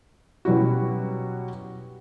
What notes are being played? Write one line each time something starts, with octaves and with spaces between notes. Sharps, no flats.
B2 F#3 G3 C#4 E4 F#4